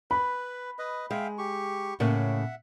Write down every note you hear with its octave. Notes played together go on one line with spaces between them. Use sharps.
B4 B5
B4 D#5
G#3 E5 F5 G5
G4 C#6
A2 C#3 A#3 E5 F#5